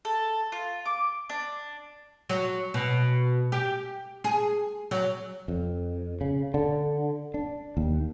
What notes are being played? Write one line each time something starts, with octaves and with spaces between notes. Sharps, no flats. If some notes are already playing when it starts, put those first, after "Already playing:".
A4
F4
D6
D4
F#3
B2
G4
G#4
F#3
F2
C#3
D3
D4
D#2